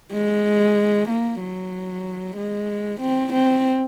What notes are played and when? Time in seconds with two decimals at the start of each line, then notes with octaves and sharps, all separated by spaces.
0.12 G#3
1.09 A#3
1.40 F#3
2.37 G#3
3.01 C4
3.33 C4